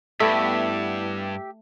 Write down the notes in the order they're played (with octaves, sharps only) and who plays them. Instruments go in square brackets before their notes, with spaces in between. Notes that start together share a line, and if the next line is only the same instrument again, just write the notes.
[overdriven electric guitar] G2 [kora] A3 [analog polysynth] B3 E4 [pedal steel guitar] G4 E5